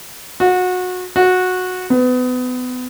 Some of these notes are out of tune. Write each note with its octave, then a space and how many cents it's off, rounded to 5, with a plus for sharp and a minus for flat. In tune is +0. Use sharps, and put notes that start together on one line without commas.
F#4 -25
F#4 -15
B3 +30